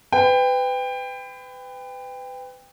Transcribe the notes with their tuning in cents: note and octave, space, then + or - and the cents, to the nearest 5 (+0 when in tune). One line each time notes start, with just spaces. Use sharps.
B4 +30 G5 +20